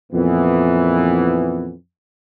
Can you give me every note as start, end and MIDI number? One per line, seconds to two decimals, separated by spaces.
0.13 1.70 41
0.13 1.70 46
0.13 1.70 52
0.13 1.70 59